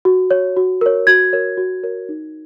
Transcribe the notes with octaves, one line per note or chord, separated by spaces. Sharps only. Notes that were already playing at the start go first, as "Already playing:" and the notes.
F#4
C#5
F#4
A#4 C#5
F#4 G#6
A#4 C#5
F#4
A#4 C#5
D#4